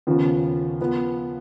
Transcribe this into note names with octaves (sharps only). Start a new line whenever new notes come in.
D#2 C#3 F3 B3
F3 B3